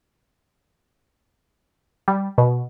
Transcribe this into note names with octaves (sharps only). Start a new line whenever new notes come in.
G3
B2